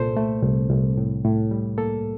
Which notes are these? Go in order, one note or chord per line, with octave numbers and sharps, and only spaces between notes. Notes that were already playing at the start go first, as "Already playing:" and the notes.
Already playing: C2 A#2 A4 C5
A3
C2
C2
A2
A2
G3
A#3 A4